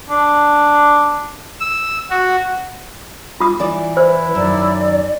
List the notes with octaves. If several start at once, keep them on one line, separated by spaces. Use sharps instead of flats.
D4
E6
F#4
F4 D#6
E3 D5
E4 B4 C5
F#2 D#3 D5